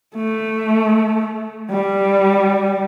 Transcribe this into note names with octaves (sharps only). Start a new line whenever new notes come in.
A3
G3